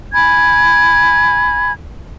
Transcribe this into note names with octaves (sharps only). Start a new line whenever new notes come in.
G#5 B5 G#6